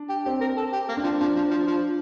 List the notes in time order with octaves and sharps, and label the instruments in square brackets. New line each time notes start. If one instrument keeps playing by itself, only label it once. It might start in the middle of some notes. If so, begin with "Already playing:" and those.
Already playing: [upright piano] D4
[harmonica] G4
[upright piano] C4 [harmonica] G4
[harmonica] A#4
A4
G4
A#3
[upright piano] D4
[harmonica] F3
[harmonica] F3 [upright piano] D4
[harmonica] F3
F3
F3